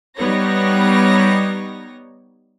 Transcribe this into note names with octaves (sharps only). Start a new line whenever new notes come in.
G3 B3 D#4 C#5 A#6